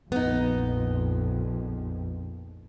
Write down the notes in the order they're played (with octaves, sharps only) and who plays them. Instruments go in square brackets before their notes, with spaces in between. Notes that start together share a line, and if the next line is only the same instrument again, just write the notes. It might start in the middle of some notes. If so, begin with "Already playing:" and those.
[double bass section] A#1 F2 [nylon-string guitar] B3 D#4